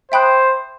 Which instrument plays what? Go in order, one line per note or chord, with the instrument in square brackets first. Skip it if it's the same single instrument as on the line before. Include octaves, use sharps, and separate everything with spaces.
[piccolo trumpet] C5 [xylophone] E5 G5 B5 D#6 F#6